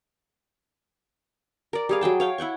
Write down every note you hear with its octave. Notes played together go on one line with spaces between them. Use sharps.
A#4 D5
G3 G#4 F5
F#3 G#4 G5 A5
C#5 F5 G5
E4 F#5 G5 C#6